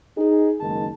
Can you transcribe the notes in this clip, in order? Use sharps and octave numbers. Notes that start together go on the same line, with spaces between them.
D#4 G#4
F#1 D#3 G#3 A5